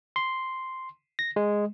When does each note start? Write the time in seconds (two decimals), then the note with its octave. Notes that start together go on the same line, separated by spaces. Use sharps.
0.16 C6
1.19 A#6
1.36 G#3